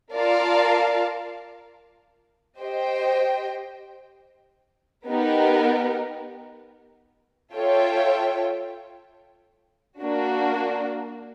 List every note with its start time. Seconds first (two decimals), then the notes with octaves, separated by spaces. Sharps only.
0.14 F4 A#4 D5 F5 A5
2.61 G4 C5 D#5 G5
5.08 B3 D#4 G4 A#4
7.55 F4 A4 C#5 E5 G5
10.01 A#3 D4 F#4